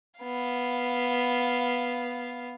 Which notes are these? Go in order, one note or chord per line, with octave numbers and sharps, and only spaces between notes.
B3 F5